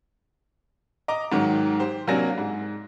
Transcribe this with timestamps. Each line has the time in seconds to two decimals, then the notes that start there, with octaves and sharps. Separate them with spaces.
1.08 D#5 A#5 D6
1.32 G#2 D#3 F#3
1.79 G4 C5
2.07 C3 F#3 A#3 D4 G#5 A#6
2.38 G#2